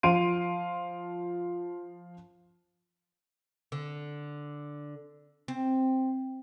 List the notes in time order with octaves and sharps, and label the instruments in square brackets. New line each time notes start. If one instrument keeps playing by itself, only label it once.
[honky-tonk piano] F3 F5 C6 D7 D#7
[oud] D3
C4